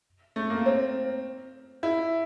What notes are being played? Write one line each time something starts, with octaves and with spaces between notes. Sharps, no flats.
A3
A#3
C4
E4